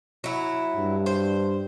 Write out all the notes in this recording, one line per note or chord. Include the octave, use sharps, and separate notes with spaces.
F#3 E4
G2
C5